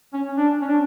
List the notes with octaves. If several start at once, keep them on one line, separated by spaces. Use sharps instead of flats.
C#4
D4
C#4
D4